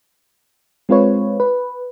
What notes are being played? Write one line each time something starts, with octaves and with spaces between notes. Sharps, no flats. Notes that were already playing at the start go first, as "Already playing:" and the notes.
G#3 C4 F4 B4 C#5
B4